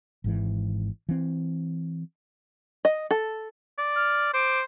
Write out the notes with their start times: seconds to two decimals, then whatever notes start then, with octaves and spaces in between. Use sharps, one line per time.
0.24 G#1 G#2 E3
1.09 E3 C4
2.85 D#5
3.11 A4
3.78 D5
3.96 F6
4.34 C5 D6